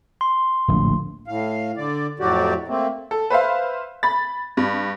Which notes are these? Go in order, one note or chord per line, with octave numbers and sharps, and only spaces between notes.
C6
D1 A#1
A2 F5
D3 D5
F2 A2 F#3 F#4 G4 D5
A3 A#3 C4
A4
B4 C5 E5 F5
B5 A6
G2